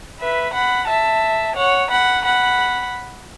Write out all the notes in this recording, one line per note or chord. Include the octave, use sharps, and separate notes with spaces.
B4 E5
F#5 B5
E5 A5
C#5 F#5
F#5 B5
F#5 B5